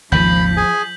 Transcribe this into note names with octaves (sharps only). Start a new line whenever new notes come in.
G#1 D#2 C#3 F3 B5 G6 B6 F#7
G#4 G#5